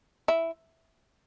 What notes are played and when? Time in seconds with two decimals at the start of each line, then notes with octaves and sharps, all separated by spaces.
0.28 E4